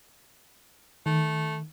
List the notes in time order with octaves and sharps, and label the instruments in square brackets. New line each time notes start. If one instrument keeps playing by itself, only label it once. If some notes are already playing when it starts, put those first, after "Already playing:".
[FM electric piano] D#3 [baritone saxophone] A3